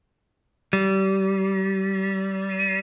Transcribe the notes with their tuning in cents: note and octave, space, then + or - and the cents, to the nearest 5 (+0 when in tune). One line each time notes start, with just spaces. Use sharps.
G3 -25